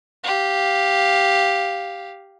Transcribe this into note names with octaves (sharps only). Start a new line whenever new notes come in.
G4 F5